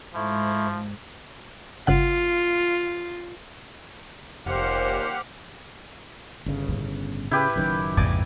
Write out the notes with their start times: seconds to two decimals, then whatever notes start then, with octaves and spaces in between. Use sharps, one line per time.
0.15 G#2 F3 A3 E4
1.87 G1 C#3 F4 F#5
4.46 F1 D#2 A#2 A#3 G4 C5 F#5 F6
6.46 G1 C#3
6.68 A2 C#4
7.31 C#3 E4 G4 B4
7.56 F#1 F#2 D#3
7.97 A#1 F2 G#2 C#3 D5 G#5 D6